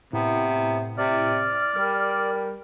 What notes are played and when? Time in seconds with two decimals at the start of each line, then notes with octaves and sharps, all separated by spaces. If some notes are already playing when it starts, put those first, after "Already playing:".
0.13 A2 C3 B3
0.98 C3 D5 F6
1.76 G3 A#4